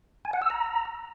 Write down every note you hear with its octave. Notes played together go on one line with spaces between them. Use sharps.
G#5
F#5
E6
A#5